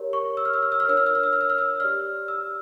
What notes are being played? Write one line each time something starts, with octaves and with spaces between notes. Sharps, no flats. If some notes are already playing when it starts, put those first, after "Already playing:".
Already playing: G4 A#4 C#5
C#6
E6
F6
E6
F6
E6
F6
D4 F4 A#4 C#5 E6
F6
E6
F6
E6
F6
E6
F6
E6
G4 D5 F6
E6